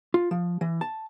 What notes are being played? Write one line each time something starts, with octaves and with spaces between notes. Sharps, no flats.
F4
F3
E3
A5